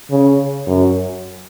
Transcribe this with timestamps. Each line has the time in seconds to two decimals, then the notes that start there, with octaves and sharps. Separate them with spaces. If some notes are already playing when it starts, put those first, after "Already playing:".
0.11 C#3
0.67 F#2